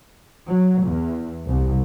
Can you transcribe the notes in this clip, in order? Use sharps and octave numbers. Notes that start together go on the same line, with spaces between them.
F#3
E2
C2